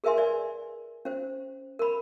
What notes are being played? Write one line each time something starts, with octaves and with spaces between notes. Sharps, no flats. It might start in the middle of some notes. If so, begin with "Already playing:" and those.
G#4 A#4 B4 E5 G#5 C6
A#4 D5 G#5
C#4 C5
A#4 B5